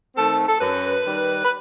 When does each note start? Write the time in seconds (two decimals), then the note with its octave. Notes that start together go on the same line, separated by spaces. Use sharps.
0.14 D#3 A3 C4 A4
0.48 A4
0.59 F#2 B4
1.04 D#3 G3
1.43 B4